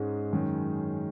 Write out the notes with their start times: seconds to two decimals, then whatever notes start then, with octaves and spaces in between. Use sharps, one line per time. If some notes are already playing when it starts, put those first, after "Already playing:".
Already playing: G#2 G#3 C#4 D#4 G#4
0.33 F#2 D#3 G#3 C#4